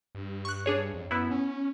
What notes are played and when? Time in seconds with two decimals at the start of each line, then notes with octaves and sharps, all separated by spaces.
0.15 G2
0.45 C#6 F#6
0.66 D4 G#4 C#5
0.94 F2
1.11 F#2 B3 E4
1.31 C#4